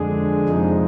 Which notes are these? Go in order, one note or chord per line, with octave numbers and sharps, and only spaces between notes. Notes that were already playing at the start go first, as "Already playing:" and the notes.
Already playing: F2 D3 G#3 D4 G#4
F2 C3 F3 G#3 D#4